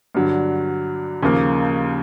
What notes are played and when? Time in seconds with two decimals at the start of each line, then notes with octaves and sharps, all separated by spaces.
0.15 G2 D3 F#3
1.22 D#2 C#3 F3 A#3